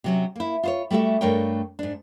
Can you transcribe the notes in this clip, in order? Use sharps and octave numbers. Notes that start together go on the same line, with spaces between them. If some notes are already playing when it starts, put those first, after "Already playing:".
C3 F#3 C#4
A#3 E4
F4 C5 C#5
G3 A3 F#4 A4 E5
G2 A3 D4 A#4 C#5 G5
G#2 D4